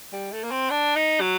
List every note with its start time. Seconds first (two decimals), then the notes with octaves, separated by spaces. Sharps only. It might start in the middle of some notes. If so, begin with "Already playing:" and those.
0.13 G3
0.32 A3
0.44 A#3
0.51 C4
0.70 D4
0.96 D#4
1.21 F#3